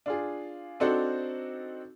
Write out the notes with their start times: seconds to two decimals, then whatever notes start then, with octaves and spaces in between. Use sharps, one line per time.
0.06 D4 F4 G#4
0.80 C4 D4 D#4 F#4 A4 C5